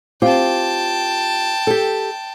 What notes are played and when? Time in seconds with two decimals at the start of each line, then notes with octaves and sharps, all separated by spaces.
0.22 C4 F4 G4 G5 A5
1.67 G4 A4